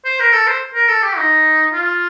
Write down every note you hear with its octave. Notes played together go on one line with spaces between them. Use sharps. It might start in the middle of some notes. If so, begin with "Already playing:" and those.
C5
A#4
A4
C5
A#4
A4
G4
D#4
F4